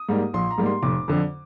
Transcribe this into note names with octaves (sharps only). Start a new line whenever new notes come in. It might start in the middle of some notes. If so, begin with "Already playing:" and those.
Already playing: D#6
G#2 G3 A#3
A#1 C6
A#5
G#2 G3 A#3
C6
F1 D6
F2 D3